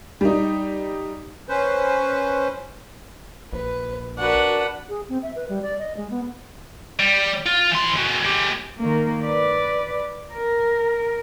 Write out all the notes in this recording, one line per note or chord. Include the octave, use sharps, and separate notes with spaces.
G3 D#4
C#4 B4 C5
A#1 B4
D4 F#4 A#4 B4 F#5
G#4
C4
E5
B4
G3
D5
D#5
G#3
B3
G3
F4
E3 C6
G#3 F#4
G#3 G4
D#3 A#3
B4 D5
A#4